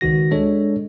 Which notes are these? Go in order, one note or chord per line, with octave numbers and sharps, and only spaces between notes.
C#2 D#3 F#4 A#6
G#3 D4 A4 C#5